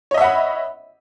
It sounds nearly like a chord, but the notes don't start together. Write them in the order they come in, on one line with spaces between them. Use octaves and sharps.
C#5 D#5 E5 F#5 B5